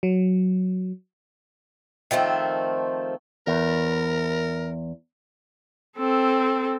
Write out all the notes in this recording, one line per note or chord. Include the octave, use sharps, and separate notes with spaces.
F#3
D#3 F3 A3 C4
E2 A#4
C4 A4